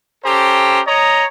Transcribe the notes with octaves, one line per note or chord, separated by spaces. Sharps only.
C#4 G4 A4 C5 G5 A#5
C#5 D#5 A#5